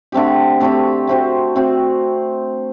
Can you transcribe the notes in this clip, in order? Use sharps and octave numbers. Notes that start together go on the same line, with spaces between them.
D3 A3 C4 G4
D3 A3 C4 G4
A3 C4 F#4 C5
A3 C4 F#4 C5